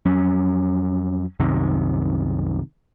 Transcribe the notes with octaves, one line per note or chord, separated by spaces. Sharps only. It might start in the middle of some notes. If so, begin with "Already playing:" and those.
F2 F#3 C#4
C2 F#2 C3 D#3